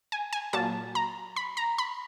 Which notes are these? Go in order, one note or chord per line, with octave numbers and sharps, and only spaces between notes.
G#5
G#5
A#2 F#3 A#3 A5
A#5
B5
A#5
B5